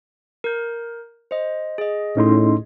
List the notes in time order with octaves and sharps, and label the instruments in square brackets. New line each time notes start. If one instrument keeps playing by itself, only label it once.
[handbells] A#4 G6
C5 D#5
G#4 D#5
[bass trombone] A2 [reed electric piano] C#4 D#4 C6